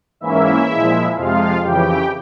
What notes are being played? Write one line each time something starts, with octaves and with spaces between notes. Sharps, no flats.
G#2 E3 A#3 C#4 E4 E5
A#2 F3 G#3
F2 C3 F3 G#3 F4 F5
F2 C#3 E3 G4 G5